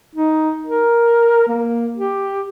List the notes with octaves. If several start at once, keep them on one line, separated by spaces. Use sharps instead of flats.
D#4
A#4
A#3
G4